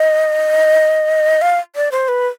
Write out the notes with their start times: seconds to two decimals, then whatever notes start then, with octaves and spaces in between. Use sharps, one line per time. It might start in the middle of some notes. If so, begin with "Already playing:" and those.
Already playing: D#5
1.42 F5
1.76 D5
1.92 C5
2.08 B4